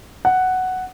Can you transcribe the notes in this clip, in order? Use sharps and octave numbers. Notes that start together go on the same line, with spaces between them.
F#5